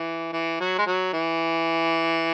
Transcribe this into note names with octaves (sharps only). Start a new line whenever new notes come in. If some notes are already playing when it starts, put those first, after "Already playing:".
Already playing: E3
E3
F#3
G#3
F#3
E3